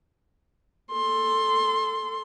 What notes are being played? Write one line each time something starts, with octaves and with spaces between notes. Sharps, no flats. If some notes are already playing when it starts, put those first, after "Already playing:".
A4 C6